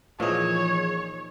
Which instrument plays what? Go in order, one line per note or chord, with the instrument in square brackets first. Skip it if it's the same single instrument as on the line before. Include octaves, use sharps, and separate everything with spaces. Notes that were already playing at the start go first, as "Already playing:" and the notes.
[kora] A#2 D#4 [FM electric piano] E3 F3 G#4 [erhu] C#5